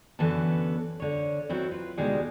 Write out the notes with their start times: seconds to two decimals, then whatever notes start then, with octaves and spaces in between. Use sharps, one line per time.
0.19 F#2 D3 E3 B3 C#4 A5
1.00 D3 C#5
1.49 F#3 C4 D#4 E4
1.71 F4 B4
1.98 D2 B2 G3 G#3 D#4 G#4